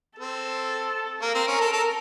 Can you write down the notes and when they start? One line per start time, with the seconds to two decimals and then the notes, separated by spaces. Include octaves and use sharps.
0.18 C4 A4
1.22 A#3 A#4
1.35 C4
1.47 C#4
1.61 A4
1.73 A4